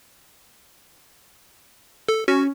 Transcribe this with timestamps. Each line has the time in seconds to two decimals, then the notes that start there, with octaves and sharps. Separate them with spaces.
2.09 A4
2.28 C#4 F#4